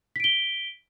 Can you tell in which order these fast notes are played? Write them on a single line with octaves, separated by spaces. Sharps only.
B6 D7 G7